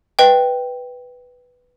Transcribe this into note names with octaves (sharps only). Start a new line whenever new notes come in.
B4 D#5 G5